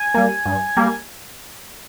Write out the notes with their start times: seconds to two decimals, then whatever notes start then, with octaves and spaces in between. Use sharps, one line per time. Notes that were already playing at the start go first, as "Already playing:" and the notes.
Already playing: G#5
0.14 G3 A#3
0.45 G2
0.77 G3 A#3